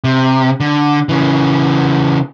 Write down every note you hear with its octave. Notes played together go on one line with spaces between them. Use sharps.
C3
D3
C#3 E3